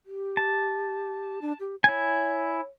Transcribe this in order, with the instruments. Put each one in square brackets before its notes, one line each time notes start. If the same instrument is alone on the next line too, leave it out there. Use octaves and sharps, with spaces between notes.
[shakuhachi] G4
[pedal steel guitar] A5
[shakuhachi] D4
G4
[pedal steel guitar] E4 G#5 [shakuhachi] C#5